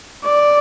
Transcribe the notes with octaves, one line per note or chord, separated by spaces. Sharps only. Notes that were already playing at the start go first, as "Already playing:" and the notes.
D5